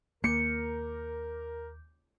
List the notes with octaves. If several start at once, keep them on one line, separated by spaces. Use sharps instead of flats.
D#2 A#3 A#4 D6 G6 C#7